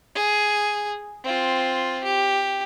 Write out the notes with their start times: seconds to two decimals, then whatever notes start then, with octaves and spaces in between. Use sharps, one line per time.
0.15 G#4
1.24 C4 F4
2.04 G4